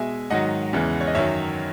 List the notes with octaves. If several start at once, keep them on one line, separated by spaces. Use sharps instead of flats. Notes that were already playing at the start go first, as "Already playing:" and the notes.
Already playing: B2 G#3 E5 G#5
G#2 D#3 F#3 D#5 F#5
E2 C#3 E3 G#3
C#5
D#5
F#2 D#3 F#3 C#5 E5